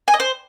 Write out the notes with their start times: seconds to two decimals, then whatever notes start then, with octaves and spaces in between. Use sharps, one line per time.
0.08 G#5
0.14 D#5
0.20 C5